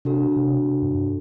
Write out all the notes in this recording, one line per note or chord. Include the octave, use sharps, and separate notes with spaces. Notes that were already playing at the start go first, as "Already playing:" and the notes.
C3 D4 F#4 A4
C3
G2